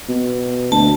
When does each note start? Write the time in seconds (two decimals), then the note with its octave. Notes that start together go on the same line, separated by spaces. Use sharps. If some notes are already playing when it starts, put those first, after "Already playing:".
0.09 B2
0.72 D2 A5